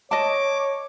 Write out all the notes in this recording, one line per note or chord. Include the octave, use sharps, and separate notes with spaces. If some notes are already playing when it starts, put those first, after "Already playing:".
C#5 D#5 A5 D6